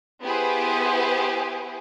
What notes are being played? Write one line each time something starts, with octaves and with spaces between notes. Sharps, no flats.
B3 E4 G4 G#4 B4 C5